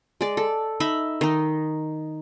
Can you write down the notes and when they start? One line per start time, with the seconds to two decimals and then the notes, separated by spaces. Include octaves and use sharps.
0.21 G#3 D5
0.37 A4
0.80 D#4 E5 B5
1.21 D#3 D#4